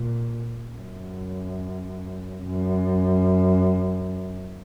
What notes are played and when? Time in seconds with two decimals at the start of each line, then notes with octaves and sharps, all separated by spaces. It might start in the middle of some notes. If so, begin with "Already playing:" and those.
Already playing: A#2
0.75 F#2
2.44 F#2